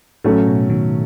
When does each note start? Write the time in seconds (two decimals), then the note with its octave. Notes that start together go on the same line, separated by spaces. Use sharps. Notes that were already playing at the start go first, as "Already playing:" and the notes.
0.24 A2 F#3 A3 C#4
0.47 B2
0.70 B2 D#3